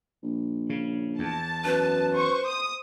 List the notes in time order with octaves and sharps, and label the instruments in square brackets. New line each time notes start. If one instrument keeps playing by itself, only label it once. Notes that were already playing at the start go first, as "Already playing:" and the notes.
[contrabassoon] A#1
[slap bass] C#3
[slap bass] E2 [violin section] A5
[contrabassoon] F#2 [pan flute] B4
[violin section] C5 C#6
D#6